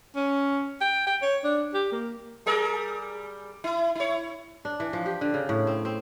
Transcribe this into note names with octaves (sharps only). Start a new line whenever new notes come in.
C#4
G5
G5
C#5
D4
G4
A#3
G3 G#4 A#4
E4
E4 C#5
D4
E3
F3
G4
D3
C#3
A2
C4
C4